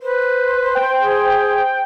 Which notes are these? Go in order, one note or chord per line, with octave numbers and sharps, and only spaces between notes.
B4 C5
G5
G#4